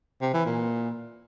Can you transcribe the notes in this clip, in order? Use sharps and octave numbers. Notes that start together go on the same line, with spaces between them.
C3
E3
A#2